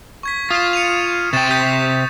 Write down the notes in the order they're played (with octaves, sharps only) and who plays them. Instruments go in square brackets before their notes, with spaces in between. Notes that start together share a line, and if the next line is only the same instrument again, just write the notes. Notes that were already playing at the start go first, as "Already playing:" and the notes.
[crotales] C#6 G#6 B6
[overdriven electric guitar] F4 [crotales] D#6 E7
[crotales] C#7 D#7 F7
[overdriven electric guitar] C3 G5 [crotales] C#6 A6 E7
[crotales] D#6 G6 B6